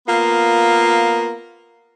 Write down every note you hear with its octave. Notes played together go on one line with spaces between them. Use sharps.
A#3 B3 F4